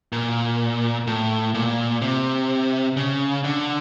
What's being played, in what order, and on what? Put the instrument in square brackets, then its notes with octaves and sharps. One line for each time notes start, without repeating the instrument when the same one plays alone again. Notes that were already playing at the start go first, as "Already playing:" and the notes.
[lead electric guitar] A#2
A2
A#2
C3
C#3
D3